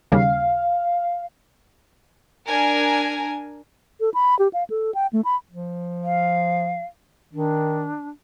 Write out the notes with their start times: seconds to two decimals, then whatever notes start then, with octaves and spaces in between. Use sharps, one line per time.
0.12 D#2 C#3 G3 F5
2.46 D4 A#4 G#5
4.00 A4
4.14 B5
4.39 G4
4.53 F5
4.70 A4
4.95 G5
5.13 A3
5.25 B5
5.50 F3
6.04 F5
7.33 D#3 D4